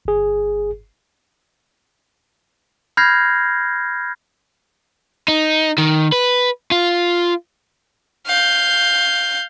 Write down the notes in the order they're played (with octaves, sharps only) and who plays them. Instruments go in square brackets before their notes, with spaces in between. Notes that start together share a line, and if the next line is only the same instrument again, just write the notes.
[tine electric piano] G1 G#4
[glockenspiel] B5 F6 G6 G#6 A#6 C7
[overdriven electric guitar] D#4
D#3
B4
F4
[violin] F5 G6